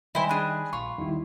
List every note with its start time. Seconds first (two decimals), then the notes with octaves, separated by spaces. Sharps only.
0.15 D#3 G3 E4 C5 D#5 G5 G#5
0.29 D4 G#4 B5
0.73 A#1 F4 C#6
0.98 E2 D#3 G3 E4